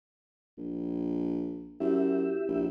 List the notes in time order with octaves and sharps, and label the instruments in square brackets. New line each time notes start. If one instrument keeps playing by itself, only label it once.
[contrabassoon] A#1
[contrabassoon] F#2 [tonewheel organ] E4 G4 E5
[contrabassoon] A#1